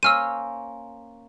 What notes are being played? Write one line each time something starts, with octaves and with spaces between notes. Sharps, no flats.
A#3 C#4 C5 E6 F6 D#7